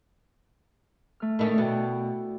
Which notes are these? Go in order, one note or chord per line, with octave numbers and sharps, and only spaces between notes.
A3 F6
D#3 A3 C#4 E4 D5
B2 F#4 A4 G5